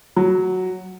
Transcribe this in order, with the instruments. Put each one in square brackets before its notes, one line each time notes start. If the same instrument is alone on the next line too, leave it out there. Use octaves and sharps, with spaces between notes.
[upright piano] F#3